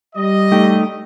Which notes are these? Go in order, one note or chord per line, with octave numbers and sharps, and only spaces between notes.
G3 D#5
A3 D#4 G4